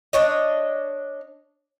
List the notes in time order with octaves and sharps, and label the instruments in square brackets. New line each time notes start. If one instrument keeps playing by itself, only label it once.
[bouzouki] D4 C#5 D#5